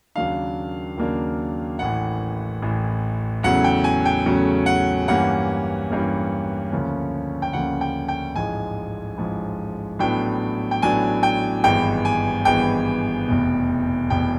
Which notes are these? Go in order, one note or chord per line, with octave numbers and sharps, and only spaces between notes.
D#2 C#3 F#3 A#3 D4 F5
D#2 C#3 F#3 A#3 D4
A1 A2 E3 F#5
A1 A2 E3
E2 C#3 F#3 A3 C#4 F#5
G5
G#5
G5
E2 C#3 F#3 A3 C#4
F#5
G2 E3 G3 A#3 C#4 F#5
G2 E3 G3 A#3 C#4
D2 C#3 F3 A#3 C#4
G5
D2 C#3 F3 A#3 C#4 F#5
G5
G5
A1 G#2 F3 G#3 G#5
A1 G#2 F3 G#3
A1 A2 F#3 B3 D4 G5
G5
A1 A2 F#3 B3 D4 G#5
G5
G#1 G2 E3 G#3 B3 G5
G#5
G#1 G2 E3 G#3 B3 G5
F1 E2 B2
F1 E2 B2 G5